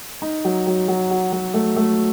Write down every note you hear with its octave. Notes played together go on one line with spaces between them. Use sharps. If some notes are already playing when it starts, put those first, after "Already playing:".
D#4
F#3
F#3
F#3
F#4
F#3
A3
A3